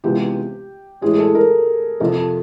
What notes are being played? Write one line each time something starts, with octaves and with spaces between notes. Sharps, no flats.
C#2 C3 E3 G#3 B3 G4
A2 E3 G#3 G#4
A4
A#4
F2 C3 F3 A4